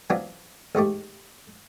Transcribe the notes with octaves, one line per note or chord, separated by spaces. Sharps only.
E3 F#3 B3 C4 D4 F4
A1 G#2 A3 G4